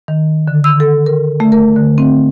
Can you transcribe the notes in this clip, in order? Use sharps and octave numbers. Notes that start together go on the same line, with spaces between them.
D#3
D3
E6
A4
A#4
A3
A#4
D3
C4